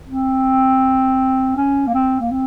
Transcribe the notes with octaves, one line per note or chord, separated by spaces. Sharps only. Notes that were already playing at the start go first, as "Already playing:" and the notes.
C4
C#4
A#3
C4
A#3
C4